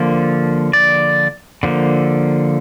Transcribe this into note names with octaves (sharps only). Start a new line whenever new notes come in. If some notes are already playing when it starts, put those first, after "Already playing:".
Already playing: D3 F3 A#3
D5
D3 F3 A#3